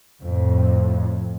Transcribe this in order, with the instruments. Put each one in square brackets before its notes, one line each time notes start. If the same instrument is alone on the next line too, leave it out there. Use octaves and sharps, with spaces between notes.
[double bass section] F2 A2